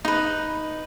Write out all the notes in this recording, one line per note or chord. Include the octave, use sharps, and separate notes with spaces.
D#4 B4